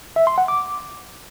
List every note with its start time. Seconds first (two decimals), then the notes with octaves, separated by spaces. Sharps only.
0.16 E5
0.27 C6
0.38 F#5
0.48 D6